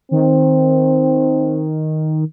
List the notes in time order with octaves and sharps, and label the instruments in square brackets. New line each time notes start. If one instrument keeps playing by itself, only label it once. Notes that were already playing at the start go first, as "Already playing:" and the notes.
[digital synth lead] D#3 [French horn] C4